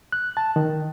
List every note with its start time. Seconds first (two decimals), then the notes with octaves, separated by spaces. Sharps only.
0.12 F#6
0.37 A5
0.56 D#3